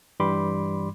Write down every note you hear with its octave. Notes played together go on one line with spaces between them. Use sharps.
G2 E3 G3 B5 C6 D6